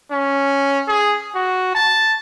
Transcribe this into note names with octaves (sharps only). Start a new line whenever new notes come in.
C#4
G#4
F#4
A5